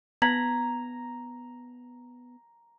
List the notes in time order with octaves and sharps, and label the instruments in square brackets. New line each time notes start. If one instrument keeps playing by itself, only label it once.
[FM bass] B3 [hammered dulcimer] A#5 [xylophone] G#6 B6 F#7